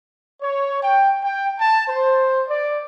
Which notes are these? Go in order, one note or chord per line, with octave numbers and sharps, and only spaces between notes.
C#5
G5
G5
A5
C5
D5